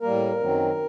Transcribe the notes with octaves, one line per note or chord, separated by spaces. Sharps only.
A2 G3 A#3 A#4
F#2 D#3 F#3 C4